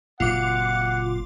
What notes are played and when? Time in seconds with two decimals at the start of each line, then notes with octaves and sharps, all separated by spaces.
0.20 F#1 A#2 F#3 C4 F4 F#5 D6